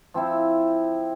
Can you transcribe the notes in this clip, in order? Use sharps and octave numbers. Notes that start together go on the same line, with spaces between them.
F3 C4 E4